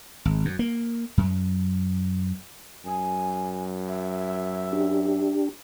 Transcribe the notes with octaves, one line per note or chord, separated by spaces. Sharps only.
G#1
F#2
A#3
F#2
F#2 G#5
E5
D4 G4